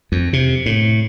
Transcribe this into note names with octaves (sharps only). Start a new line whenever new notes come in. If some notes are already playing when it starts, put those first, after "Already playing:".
F2
C3
A2